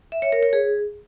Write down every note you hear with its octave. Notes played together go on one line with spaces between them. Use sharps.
E5
C#5
A#4
C#5
G#4